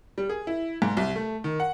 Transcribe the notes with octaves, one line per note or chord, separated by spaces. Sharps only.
G3
G#4
E4
G#2
C2
A3
D#3
F#5